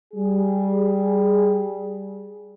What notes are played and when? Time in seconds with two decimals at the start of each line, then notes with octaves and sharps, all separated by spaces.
0.14 G3 G#4